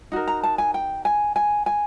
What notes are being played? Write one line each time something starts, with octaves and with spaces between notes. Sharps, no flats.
D#4 F#4 A#4
A#5
A5
G#5
G5
G#5
G#5
G#5